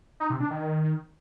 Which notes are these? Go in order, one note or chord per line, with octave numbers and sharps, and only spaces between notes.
D#4
C3
D4
D#3